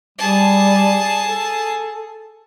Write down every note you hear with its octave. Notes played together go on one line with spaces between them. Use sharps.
G3 G#4 A5
A4